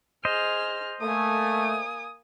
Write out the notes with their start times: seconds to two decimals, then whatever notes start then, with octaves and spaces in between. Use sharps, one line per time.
0.25 G#4 C5 D#5 F6
1.01 A3 A#3 G#5 D#6